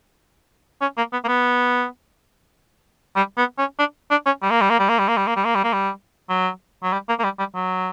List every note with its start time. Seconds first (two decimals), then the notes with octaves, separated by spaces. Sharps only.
0.81 C#4
0.97 A#3
1.13 B3
1.24 A#3
1.28 B3
3.16 G3
3.37 B3
3.58 C#4
3.79 D4
4.11 D4
4.26 C#4
4.42 G3
4.51 A#3
4.61 G3
4.70 A#3
4.79 G3
4.89 A#3
4.99 G3
5.08 A#3
5.17 G3
5.27 A#3
5.36 G3
5.45 A#3
5.55 G3
5.64 A#3
5.73 G3
6.29 F#3
6.83 F#3
6.93 G3
7.09 A#3
7.19 A#3
7.24 G3
7.39 G3
7.55 F#3